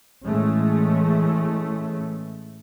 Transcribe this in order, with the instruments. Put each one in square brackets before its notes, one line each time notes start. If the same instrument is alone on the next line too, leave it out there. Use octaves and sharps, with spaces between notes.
[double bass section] A2 E3 G#3 A3 C#4